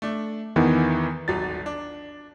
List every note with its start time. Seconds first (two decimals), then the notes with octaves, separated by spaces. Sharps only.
0.02 A3 D4
0.56 E2 D#3 E3 B3
1.28 D#1 G#1 F#3 A6
1.66 D4